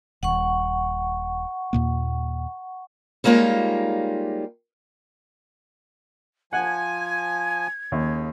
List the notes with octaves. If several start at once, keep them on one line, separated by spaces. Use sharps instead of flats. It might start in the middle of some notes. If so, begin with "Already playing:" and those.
D#1 F#5 C#6
D#2 A#2 A#3
G3 G#3 A#3 D#4 F4 C#5
F3 F#5 G#5 G#6
D#2 C#3